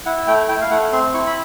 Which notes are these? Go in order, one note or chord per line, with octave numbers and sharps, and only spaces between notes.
E4 F#5
A3 G5
E4 G5
F5
A3 F#5
C4 C6
E4 C#6
B5